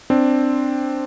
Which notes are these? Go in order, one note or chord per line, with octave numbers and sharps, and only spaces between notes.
C4 D4